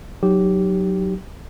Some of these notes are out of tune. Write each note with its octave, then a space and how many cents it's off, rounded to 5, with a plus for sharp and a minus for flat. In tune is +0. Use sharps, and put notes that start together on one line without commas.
F#3 +0 D#4 -10 G4 -10